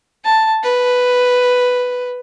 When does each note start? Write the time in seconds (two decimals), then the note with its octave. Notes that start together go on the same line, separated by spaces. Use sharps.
0.25 A5
0.63 B4